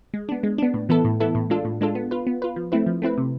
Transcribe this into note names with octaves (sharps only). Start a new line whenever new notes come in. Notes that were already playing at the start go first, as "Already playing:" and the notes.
G#3
B3 D4
G#3
B3 D4
A2
E3 B3 E4 A4
A2
E3 B3 E4 A4
A2
G#3 D4 F4 A4
A2
G#3 D4 F4 A4
B3
F4 B4
B3
F4 B4
F3
A3 C4 E4 B4
F3
A3 C4 E4 B4
C3